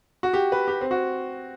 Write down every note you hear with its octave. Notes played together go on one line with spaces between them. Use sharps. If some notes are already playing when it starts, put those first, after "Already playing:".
F#4
G4
B4
G4
C4
F#4